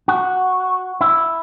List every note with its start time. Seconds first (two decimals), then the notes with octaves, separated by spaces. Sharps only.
0.08 F#4
1.01 E4